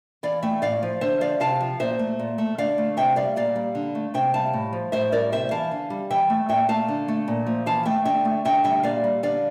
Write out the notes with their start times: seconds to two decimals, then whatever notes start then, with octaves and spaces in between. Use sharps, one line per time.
0.23 E3 D5 F5
0.43 A3 E5 G5
0.62 A2 D5 F5
0.83 F3
1.01 D3 C5 E5
1.21 F3 D5 F5
1.40 C3 F5 A5
1.60 F3
1.80 A#2 C5 E5
1.99 A3
2.19 A#2
2.38 A3
2.58 D3 D5 F5
2.78 A3
2.97 C3 E5 G5
3.16 G3 D5 F5
3.36 A#2 D5 F5
3.55 G3
3.75 D3
3.95 A3
4.14 C3 E5 G5
4.34 G3 F5 A5
4.53 A2
4.73 F3
4.92 A2 C5 E5
5.12 G3 A#4 D5
5.32 C3 C5 E5
5.51 E3 F5 A5
5.71 D3
5.90 G3
6.10 E3 E5 G5
6.30 A3
6.49 A#2 E5 G5
6.69 A3 F5 A5
6.88 D3
7.08 A3
7.28 A#2
7.46 F3
7.66 E3 F5 A5
7.85 A3 E5 G5
8.05 D3 E5 G5
8.25 A3
8.45 D3 E5 G5
8.64 G3 E5 G5
8.83 A#2 D5 F5
9.04 G3
9.23 D3 D5 F5